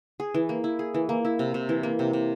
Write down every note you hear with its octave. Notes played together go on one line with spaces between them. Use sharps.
G#4
E3
A#3
E4
G#4
E3
A#3
E4
C3
C3
E3
A#3
C3
C3